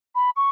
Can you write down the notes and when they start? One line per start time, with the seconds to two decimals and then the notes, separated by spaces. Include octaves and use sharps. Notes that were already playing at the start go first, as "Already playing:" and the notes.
0.15 B5
0.36 C#6